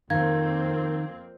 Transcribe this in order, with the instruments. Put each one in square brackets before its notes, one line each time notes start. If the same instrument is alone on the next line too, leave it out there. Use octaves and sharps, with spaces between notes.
[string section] F2 A#3 C4 [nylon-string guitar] D#3 [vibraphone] A#4 [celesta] F5 G#6